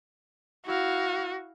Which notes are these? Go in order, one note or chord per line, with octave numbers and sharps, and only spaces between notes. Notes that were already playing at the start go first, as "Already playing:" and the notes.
E4 F#4 F5